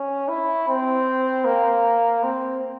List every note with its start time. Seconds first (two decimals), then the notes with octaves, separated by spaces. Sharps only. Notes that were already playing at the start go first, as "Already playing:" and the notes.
Already playing: C#4
0.29 E4
0.68 C4
1.45 A#3
2.23 C4